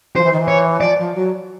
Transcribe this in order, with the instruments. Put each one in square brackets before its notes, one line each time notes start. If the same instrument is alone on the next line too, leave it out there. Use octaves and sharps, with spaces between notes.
[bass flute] F3 [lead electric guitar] C5
[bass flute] E3
D#3
E3
[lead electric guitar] C#5
[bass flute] F3 [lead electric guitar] D5
[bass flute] F3
F#3